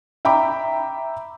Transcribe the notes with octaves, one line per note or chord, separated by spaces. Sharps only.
E5 G5 A#5 B5 D6